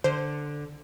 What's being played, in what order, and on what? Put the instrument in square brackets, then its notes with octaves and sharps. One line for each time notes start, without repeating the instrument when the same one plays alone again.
[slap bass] D3 [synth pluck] C5